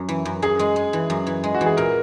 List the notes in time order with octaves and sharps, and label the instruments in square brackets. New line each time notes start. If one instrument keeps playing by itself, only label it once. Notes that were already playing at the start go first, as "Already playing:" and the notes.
Already playing: [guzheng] F#2
E3
F#2
[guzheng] F#2 [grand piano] G#4
[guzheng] G#3
G#3
E3
F#2
E3
G#3
[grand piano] F#4
[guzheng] E3
[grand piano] G#4
[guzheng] A#2 [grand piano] A#4